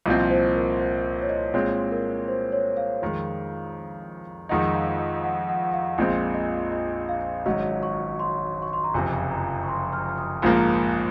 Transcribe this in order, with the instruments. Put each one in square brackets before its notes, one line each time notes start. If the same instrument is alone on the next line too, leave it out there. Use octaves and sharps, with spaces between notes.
[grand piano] C2 A#2 F3 C4 [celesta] D#5
[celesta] C5
A#4
C5
C#5
D#5
[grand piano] A#2 G#3 C4 [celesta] C#5
[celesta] A#4
C5
C#5
F5
[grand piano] F2 D#3 G#3
[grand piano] F2 D#3 G#3 D#4 [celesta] F#5
[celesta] F5
D#5
F#5
F#5
F#5
F5
[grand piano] A#1 A#2 G#3 C4 [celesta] D#5
[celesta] D#5
D#5
F5
[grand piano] G#1 G#2 F#3 C#4 [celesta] D#5
[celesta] C#6
C6
C#6
C6
A#5
[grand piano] F#1 F2 C3 [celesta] G#5
[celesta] A#5
C#6
C6
F6
F6
D#6
[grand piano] A#1 G#2 F3 A#3